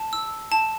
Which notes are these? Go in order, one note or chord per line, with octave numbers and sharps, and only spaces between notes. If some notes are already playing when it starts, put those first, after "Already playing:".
Already playing: A5
E6
A5